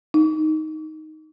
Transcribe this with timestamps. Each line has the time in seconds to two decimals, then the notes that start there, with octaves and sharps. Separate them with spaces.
0.14 D#4